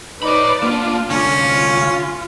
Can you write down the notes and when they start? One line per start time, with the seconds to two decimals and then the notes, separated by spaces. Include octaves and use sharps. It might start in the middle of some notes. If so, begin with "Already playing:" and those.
0.23 D#4 B4 C#5 D5 B5
0.63 A#3 B3 D4 F4
1.10 C2 D3 C#4
1.42 F4